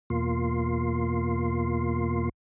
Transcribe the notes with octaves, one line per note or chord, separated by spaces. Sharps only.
E2 B2 A#3 F4 C6